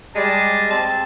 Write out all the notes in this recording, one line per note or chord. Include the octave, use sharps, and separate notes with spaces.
G3 G#3 D5 A5
C4 A5